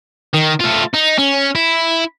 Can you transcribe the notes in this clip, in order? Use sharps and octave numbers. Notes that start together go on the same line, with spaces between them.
D#3
A3 F4
D#4
C#4
E4